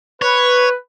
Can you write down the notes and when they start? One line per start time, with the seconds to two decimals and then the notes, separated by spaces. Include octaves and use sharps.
0.22 B4 C#5